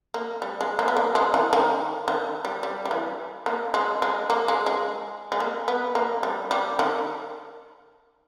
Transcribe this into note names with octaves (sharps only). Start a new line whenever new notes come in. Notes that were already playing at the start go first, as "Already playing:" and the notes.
A#3
G3
G#3
A#3
B3
A#3
G#3
E3
D#3
D#3
G3
G3
G3
E3
A#3
G#3
G#3
A#3
G#3
G#3
G#3
A#3
B3
A#3
G3
G3
D#3